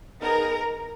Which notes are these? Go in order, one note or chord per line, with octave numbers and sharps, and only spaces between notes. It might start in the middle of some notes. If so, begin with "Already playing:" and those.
B3 D#4 G#4 A#4 A#5